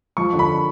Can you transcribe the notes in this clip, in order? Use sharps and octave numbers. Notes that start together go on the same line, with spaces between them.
F3 C#6
D3
B5